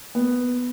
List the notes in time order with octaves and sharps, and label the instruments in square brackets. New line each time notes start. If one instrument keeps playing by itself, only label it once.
[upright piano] B3